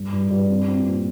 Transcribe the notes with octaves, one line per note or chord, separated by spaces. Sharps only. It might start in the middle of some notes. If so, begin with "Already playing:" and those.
Already playing: G2
G2
G2
C4
C4
A#2